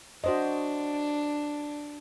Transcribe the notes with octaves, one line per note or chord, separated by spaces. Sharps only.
D4 F#4 C5 D#5